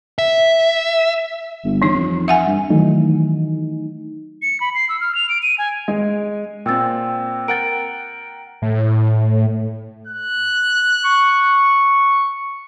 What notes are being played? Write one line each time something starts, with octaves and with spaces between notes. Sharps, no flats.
E5
G1
E3 D#4
F2
E5 F#5 G#5
G2
D#3 E3 F#3 A3 D#4
C#7
B5
C7
E6
F6
F7
D7
D#7
G#5
G#3
A#2 C4 G5 E6 A6
A#4 F#5 G5 A6 D7
A2
F#6
C#6